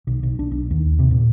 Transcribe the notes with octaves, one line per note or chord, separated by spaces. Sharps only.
B1
B1
D4
B1
D#2
C3
A#2